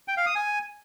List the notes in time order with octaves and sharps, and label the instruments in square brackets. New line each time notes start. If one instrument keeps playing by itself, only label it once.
[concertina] G5
F5
D#6
G#5